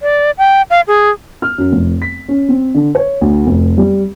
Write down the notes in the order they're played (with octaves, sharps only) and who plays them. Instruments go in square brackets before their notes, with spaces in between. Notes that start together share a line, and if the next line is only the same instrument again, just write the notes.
[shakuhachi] D5
G5
F5
G#4
[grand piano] F6
F#2
F1
B6
C#4
C4
D3
C#5
D2
F1
G3